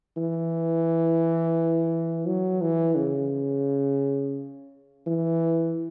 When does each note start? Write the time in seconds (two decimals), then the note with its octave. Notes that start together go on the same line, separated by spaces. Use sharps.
0.17 E3
2.27 F#3
2.62 E3
2.96 C#3
5.07 E3